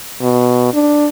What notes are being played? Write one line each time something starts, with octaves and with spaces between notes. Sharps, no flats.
B2
D4